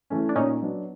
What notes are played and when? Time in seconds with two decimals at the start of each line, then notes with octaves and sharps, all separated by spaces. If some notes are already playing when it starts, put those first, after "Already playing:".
0.10 E3 A3 C#4
0.29 D4
0.35 A#2 C#4 D#4
0.62 F#3 B3 D4